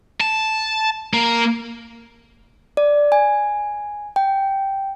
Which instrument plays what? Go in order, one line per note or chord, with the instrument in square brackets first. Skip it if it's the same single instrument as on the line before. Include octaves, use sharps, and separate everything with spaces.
[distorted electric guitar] A5
A#3
[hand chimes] D5
G#5
G5